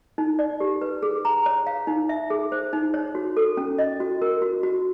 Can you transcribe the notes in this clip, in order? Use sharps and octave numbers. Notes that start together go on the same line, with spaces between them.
D#4
D5
G4
B4
G#4
A#5
C#5
F5
D#4
E5
G#4
C5
D#4
C#5
F#4
A4
C#4
D#5
F#4
A#4
F#4
F#4